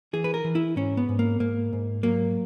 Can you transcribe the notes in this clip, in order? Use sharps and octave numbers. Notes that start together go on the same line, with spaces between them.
E3 G#4
B4
A#4
E3
E4
G#2 C#4
B3
G#2
A#3
G#2 A#3
G#2
F#3 A#3